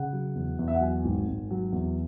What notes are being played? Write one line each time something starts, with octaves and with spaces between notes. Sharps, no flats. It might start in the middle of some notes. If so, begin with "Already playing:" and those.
Already playing: C#3 F#5
F#3
E2
E2
E5
F#5
F#3 G#5
G#1
G#1
F#3
E2